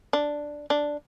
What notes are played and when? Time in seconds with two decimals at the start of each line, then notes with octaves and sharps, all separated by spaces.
0.13 D4
0.70 D4